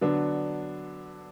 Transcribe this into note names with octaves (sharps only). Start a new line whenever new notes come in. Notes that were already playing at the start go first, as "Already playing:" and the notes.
D3 F#3 B3 D4